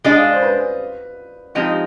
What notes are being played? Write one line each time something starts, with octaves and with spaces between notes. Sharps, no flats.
G#3 D4 G#4 D#5
F5
D5
C5
B4
F3 G#3 C4 D#4 G4